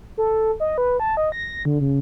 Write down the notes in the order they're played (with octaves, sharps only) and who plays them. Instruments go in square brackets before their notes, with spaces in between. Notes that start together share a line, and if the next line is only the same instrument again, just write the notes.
[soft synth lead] A4
D#5
B4
A5
D#5
A#6
D3
C#3